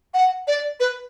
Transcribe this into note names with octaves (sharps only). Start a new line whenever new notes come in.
F#5
D5
B4